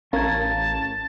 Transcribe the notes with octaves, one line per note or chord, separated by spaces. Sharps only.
A1 C#4 A#4 F5 A5 G#6